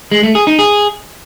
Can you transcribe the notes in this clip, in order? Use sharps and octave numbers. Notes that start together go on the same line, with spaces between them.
G#3
A3
G#4
D#4
G#4